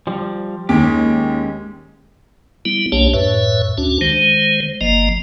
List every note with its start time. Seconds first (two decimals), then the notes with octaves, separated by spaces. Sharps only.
0.07 F3 G3
0.69 D#2 G#3 C#4 G4
2.65 G3 B3 E4
2.92 B1 A#3 D4 G4 C#5 A5
3.14 F#2 A2 B4 C#5 E5
3.78 D2 C#4 D4 F#4
4.01 D#3 G#3 C5
4.81 G1 F3 A#3 D#5 A#5